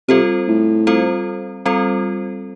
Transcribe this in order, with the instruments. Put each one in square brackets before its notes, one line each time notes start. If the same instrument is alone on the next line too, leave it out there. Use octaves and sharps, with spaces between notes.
[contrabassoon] C3 [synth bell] G3 C4 F4 A4 C5
[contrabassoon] A2
[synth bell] G3 C4 F4 A4 C5
G3 C4 F4 A4 C5